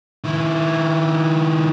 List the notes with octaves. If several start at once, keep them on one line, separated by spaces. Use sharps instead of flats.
D#3 E4